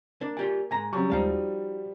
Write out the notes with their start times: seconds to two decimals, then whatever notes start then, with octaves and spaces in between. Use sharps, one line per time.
0.21 A#3 D4
0.37 F4 G4 D5 G#5
0.71 G#2 G#5 A#5
0.93 C#3 F#3 G3 C#6
1.10 D#2 F3 G3 G#3 D#4 F5 A5
1.30 F#4